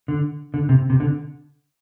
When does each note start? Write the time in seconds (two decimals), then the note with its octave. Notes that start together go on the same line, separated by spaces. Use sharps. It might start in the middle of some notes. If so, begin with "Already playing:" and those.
0.08 D3
0.54 D3
0.69 C3
0.90 C3
1.00 D3